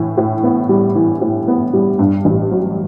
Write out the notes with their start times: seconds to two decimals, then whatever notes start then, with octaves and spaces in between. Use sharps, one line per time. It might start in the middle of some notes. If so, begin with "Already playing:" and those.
Already playing: A2 E3
0.17 A2
0.43 B3
0.69 G3
0.95 E3
1.21 A2
1.48 B3
1.73 G3
1.99 G2
2.25 A1
2.51 F#3